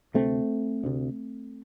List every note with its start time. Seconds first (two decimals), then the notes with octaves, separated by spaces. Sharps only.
0.14 D2 C3 A3 C4
0.84 D2 C3